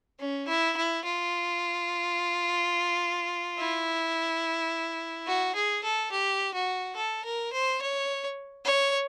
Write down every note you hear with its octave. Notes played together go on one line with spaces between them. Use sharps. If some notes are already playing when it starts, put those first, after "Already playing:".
C#4
E4
E4
F4
E4
F#4
G#4
A4
G4
F#4
A4
A#4
C5
C#5
C#5